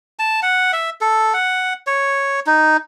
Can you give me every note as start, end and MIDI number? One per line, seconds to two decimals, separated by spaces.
0.19 0.40 81
0.42 0.72 78
0.73 0.90 76
1.01 1.33 69
1.34 1.74 78
1.87 2.40 73
2.47 2.77 63